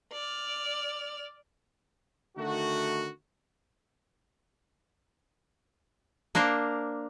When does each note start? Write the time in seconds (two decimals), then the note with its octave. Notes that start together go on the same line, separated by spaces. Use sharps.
0.13 D5 F6
2.36 D3 D#3 A3 F#4
6.35 A#3 D4 A#4 C5